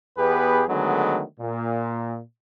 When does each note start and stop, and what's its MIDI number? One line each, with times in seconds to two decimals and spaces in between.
0.18 0.63 40
0.18 0.63 59
0.18 0.63 67
0.18 0.63 68
0.18 0.63 71
0.69 1.22 50
0.69 1.22 51
0.69 1.22 54
0.69 1.22 56
0.69 1.22 57
0.69 1.22 59
1.40 2.19 46